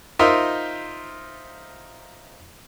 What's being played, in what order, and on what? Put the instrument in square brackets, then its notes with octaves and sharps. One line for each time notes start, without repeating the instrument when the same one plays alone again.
[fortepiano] D#4 F4 A#4 C5 E5